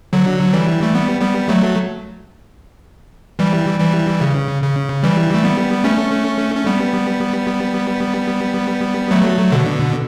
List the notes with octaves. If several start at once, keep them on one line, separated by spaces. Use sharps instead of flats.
D3 F#3
E3 G3
A3
G3 B3
G3 B3
F#3 A3
E3 G3
E3 G3
C#3
C#3
E3 G3
A3
G3 B3
A3 C#4
C#4
G3 B3
F#3 A3
B2 D3